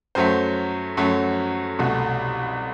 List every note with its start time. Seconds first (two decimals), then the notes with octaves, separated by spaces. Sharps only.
0.15 F#2 F#3 A3 C5
0.97 F#2 F#3 A3
1.79 C2 B2 A3